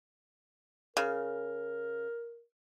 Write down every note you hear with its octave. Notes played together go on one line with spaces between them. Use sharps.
C#3 A#4